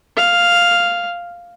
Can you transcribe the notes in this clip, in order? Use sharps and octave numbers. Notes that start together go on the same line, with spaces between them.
F5